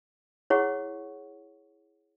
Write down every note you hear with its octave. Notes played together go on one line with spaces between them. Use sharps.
E4 G#4 C#5 F#5 C#6